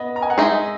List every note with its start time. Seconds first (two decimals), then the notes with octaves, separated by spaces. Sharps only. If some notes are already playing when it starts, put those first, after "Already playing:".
Already playing: B3 D#5
0.16 A#5
0.22 G#5
0.30 F#5
0.38 G#3 D#4 G#4 E5
0.52 D#5